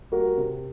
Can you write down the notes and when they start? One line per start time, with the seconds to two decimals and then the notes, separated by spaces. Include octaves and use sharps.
0.12 G3 A#3 F#4 A#4
0.38 C3